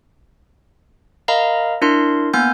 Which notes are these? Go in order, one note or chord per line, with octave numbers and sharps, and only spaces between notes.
A#4 D#5 F5 A#5 B5
D4 E4 A#4 C6
A#3 B3 G#5 F6 G6